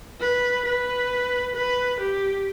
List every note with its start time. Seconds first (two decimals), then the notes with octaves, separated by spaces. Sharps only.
0.21 B4
0.65 B4
1.55 B4
2.00 G4